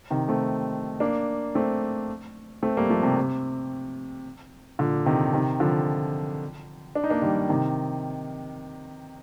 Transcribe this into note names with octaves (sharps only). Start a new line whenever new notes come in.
C3 D#3
A3 C4
A#3 D4
A3 C4
A3 C4
G3 A#3
F3 A3
C3
C3
A#2 D3
C3 D#3
C3 D#3
D3 F3
D4
D#4
A#3 D4
D#3 G3
C3 D#3